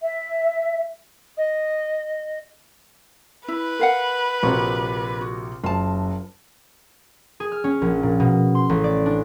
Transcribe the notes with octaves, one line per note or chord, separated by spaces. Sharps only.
E5
D#5
E4 B4
A#4 F5 F#5
A#1 C3 F#4 A#4
F#4
F#1 F4 A5
G#4
F6
C#4
A#1
A#2
B2
C6
A1
D5
D4